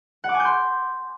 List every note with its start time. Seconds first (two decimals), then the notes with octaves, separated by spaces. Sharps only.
0.24 F#5
0.29 D6
0.34 G#5
0.40 G6
0.45 C6